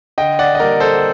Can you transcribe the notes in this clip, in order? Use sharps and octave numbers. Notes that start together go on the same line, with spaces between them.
D3 D#5 G5
D5 F#5
D#5
G3 A#3 A#4 D5
A4 C5